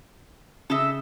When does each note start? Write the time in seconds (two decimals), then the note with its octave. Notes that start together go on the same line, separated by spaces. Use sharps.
0.70 C#3 A4 D#5 E5